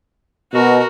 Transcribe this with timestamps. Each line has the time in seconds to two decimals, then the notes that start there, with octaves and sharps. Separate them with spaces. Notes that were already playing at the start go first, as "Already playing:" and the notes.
0.53 B2 F#4 A#4